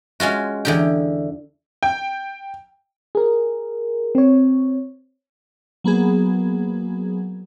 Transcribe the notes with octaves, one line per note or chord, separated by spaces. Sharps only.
G#3 C#4 F4 F#4
E2 D3 G4
G5
G#4 A#4
C4 C#5
F#3 A#3 B3 G#4